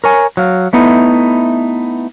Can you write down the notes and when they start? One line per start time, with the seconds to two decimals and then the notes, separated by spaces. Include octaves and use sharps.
0.04 A#4 C#5 G#5
0.37 F#3 F5
0.73 A3 B3 D#4 E4